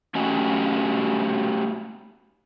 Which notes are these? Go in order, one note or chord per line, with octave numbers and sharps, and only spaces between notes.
A3 C#4 F#4 G4 D#5 G#5